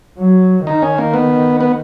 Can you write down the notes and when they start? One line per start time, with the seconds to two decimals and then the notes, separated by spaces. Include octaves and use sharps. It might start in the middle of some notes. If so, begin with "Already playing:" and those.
0.19 F#3
0.66 D#3 D#4
0.82 C#4
0.98 A#3
1.14 B3
1.60 B3